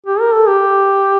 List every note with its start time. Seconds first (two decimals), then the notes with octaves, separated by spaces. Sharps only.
0.06 G4
0.20 A#4
0.34 A4
0.48 G4